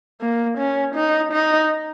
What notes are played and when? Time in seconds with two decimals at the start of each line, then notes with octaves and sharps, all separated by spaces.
0.21 A#3
0.58 C#4
0.95 D#4
1.32 D#4